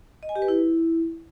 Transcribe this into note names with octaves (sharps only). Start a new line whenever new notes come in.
D#5
G#5
G4
B4
E4